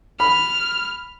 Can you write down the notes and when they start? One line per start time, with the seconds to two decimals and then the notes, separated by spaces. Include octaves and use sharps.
0.20 B5 F6